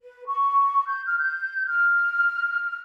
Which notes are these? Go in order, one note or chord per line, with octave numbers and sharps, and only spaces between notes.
B4
C#6
G6
F6
G6
F6